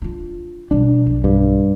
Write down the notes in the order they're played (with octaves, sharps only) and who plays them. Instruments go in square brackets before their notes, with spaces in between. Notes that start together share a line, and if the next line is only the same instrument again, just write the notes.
[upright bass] D4 F4
[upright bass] B2 G3 [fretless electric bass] D4
[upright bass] B1
[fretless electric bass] G2